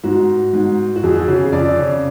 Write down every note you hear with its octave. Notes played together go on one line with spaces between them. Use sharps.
G#2 F#4
G#2
F#4
F2 G#4
G#4
F#4
C#3
G#4
F2 D5
C#3